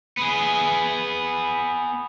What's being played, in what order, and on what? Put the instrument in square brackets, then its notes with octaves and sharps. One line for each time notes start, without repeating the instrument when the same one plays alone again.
[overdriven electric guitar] B3 G#4